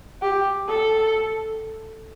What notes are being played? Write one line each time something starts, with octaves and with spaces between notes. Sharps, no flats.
G4
A4